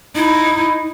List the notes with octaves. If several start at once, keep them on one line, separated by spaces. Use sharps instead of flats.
D#4 E4